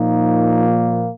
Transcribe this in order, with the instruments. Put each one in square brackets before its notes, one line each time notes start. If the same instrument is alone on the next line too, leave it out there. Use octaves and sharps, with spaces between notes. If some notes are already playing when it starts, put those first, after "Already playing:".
Already playing: [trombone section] A#2 F3 A#3 D#4